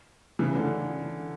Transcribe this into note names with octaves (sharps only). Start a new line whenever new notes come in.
C#3 E3
D3